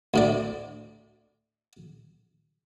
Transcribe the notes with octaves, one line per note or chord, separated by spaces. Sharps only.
D2 A2 D5